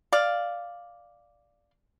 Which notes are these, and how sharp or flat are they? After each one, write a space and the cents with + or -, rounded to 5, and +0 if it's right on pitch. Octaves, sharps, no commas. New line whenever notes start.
D5 +0 F5 +0